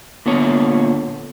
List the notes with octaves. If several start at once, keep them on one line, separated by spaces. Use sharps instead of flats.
A#2 D3 B3 C#5